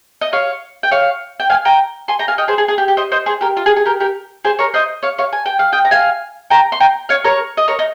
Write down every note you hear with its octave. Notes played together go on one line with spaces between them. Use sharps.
D#5
C#5 F5
G5
C#5 F5
G5
F5 G#5
G5 A#5
G#5 C6
G5 A#5
F5 G#5
D#5 G5
G#4 C5
G#4
G#4
G4
G4
C5 D#5
C5 D#5
G#4 C5
G4 A#4
F4
G#4
G#4
G4 A#4
G4 A#4
G#4 C5
A#4 C#5
C5 D#5
C#5 F5
C#5 F5
G#5
G5
F5
D#5 G5
A#5
F5 G#5
G5 A#5
C6
G5 A#5
C#5 F5
A#4 C#5
D#5
A#4 C#5
D#4